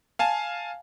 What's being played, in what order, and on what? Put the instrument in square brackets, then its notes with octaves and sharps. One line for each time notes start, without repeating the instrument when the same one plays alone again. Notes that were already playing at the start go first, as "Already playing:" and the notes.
[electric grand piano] F5 G#5 A5